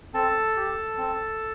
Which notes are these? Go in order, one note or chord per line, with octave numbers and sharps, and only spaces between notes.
C4 A4 A5
G4
C4